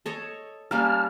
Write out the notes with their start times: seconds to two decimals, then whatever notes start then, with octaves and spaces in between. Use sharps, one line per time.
0.06 A4 C#5 D#5
0.71 G3 A#3 C#4 A5 F6